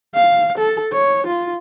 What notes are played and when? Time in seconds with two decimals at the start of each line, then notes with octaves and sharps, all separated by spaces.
0.15 F5
0.58 A4
0.93 C#5
1.27 F4